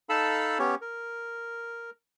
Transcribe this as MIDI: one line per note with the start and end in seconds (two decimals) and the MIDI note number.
0.09 0.58 63
0.09 0.58 69
0.09 0.58 77
0.09 0.58 81
0.09 0.58 83
0.09 0.58 88
0.59 0.75 59
0.59 0.75 61
0.59 0.75 67
0.59 0.75 73
0.81 1.90 70